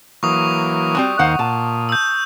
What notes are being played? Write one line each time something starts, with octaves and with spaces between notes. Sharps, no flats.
E3 F#3 A#3 C#6 D#6
G3 C4 F#4
D#2 D#3 C5 F5 F#5
A#2 A5
E6 G6